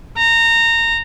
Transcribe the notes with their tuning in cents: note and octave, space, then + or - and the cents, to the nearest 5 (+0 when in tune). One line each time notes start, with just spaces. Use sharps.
A#5 -20